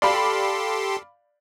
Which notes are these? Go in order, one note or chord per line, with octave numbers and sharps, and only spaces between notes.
G4 A4 D5 F5 B5 C6